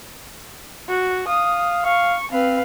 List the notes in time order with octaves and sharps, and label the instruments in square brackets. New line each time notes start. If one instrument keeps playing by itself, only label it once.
[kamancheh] F#4
[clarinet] F5 [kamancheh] D#6
[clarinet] F5 [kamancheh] C#6
[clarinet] C4 [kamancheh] B4 F5